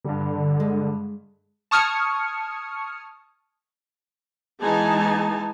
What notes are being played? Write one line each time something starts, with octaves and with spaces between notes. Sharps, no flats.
G2 D3 G3
G#3
A5 C#6 D#6 F6 G#6 C#7
E3 G#3 B3 D#4 G#5 A5